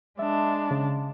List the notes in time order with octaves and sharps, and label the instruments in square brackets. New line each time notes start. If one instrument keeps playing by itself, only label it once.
[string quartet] G#3 D4 [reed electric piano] E5
[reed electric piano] C#3